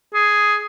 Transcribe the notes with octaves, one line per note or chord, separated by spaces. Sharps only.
G#4